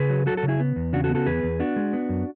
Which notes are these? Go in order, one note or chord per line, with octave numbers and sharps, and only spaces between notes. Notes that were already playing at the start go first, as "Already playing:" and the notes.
Already playing: C#3 G#4 B4
F#3
F#3 F#4 A4
F#4 A4
C#3
E4 G#4
B3
E2
C#3 D4 F#4
F#4 A4
B3
F#4 A4
E2 G#4 B4
E2
B3 D4 F#4
G#3
B3
F#2